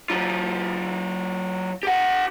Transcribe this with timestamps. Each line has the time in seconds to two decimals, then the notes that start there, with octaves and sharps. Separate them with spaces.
0.10 F#3 F4
1.83 G4 F#5